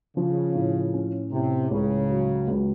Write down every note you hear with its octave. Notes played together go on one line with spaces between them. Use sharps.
C#3 F3
A2
C#4
A2 C3
C#2 C#3
F#3
C#2